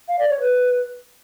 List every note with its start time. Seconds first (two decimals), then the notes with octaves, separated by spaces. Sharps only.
0.08 F5
0.19 D5
0.30 C#5
0.40 B4